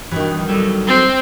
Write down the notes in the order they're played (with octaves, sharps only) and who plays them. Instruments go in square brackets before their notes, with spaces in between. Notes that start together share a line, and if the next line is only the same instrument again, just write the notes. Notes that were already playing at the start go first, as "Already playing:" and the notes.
[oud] G2 B2 D#3 [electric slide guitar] E3
[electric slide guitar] F#3 G3 A4
[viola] C4